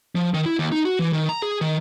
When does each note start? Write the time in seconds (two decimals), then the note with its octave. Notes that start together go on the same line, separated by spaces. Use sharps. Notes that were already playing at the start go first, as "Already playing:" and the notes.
0.15 F3
0.34 D#3
0.46 E4
0.59 D#2
0.72 D#4
0.85 F#4
0.99 E3
1.13 D#3
1.29 A#5
1.42 G#4
1.61 D#3